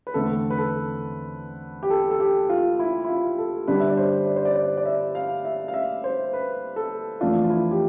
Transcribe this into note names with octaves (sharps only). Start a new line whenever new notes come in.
B4
E2 D3 A3 C4 A4
B4
A4
G4
A4
A4
G4
F4
E4
E4
F4
A4
G2 D3 G3 B3 D4 B4
E5
D5
C5
D5
C5
D5
D5
D5
E5
F5
E5
F5
E5
C5
B4
A4
F2 E3 A3 D4 F4
F4
E4
G4